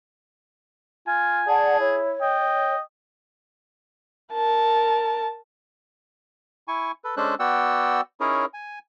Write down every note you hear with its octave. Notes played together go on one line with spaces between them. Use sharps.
F4 G#5
G#4 D5 F#5 A5
E4 C#5
D#5 G5
A#4 A5
E4 G#5 C#6
A4 B4
G#3 C#4 D4 A4 C5 F#6
B3 F#4 D5 F#5 G5 E6
C#4 D#4 E4 G#4 A#4 C#5
G#5